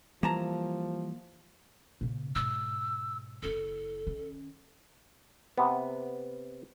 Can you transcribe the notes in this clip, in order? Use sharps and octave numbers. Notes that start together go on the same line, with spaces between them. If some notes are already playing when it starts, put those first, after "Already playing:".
E3 F3 G3 A#3 A5 A#5
A#2 C#3
G#2 B2 E6
F#1 E4 A4
D#3 C#4
C3 B3